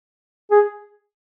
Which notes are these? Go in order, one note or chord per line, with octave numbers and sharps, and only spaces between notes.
G#4